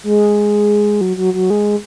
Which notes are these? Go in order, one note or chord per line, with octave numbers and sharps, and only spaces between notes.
G#3
F#3
F#3
F#3
G#3